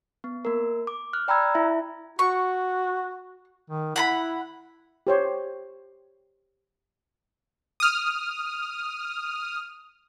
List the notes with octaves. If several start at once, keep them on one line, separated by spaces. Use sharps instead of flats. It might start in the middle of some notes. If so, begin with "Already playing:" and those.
B3
A#3 A#4
D6
F6 F#6
D5 G5 A#5 B5 E6 G#6
E4 E5
F#4 C#6
D#3
E4 F#5 A#5 B5
G4 C5 C#5
D#6 F6